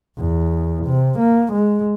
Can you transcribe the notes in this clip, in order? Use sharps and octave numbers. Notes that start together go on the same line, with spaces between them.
E2
C3
A#3
G#3